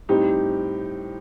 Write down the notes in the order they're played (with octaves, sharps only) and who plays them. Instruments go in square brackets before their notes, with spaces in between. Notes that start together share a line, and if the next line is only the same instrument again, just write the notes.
[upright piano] A2 G3 C4 D#4 G4